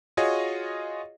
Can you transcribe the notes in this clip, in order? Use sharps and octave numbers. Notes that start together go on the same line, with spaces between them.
F4 F#4 G#4 C#5 D#5